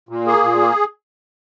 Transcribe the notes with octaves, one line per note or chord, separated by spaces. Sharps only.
A#2
A#3 G#4
A#2
A#3